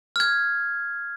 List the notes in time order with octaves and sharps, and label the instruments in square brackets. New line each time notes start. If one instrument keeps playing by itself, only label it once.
[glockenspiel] F6 G#6